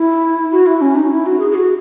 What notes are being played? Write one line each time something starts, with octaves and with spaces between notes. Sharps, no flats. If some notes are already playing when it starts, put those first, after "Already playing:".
Already playing: E4
F#4
E4
C#4
D#4
E4
F#4
G#4
G#4
F#4